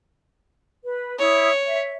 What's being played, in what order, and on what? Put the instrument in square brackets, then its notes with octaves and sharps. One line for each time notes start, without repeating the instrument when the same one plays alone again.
[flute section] B4
[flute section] E4 D#6 [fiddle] C#5
[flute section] E5